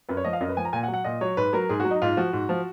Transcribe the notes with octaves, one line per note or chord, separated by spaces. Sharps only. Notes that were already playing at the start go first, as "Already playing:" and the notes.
F#2 B4
C#5
F3 D#5
F5
F#2 D#5
B4
F3 G#5
A#5
A#2 G#5
F#5
F#3
F#5
A#2 D#5
F#3 C#5
G#2 B4
F#3 A#4
G#2 G#4
F#3 F#4
D#4
G#2 F4
F3 F#4
G#2
F3